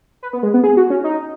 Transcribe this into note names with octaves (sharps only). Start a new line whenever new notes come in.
B4
B3
G#3
B3
G#4
F#4
C#4
D#4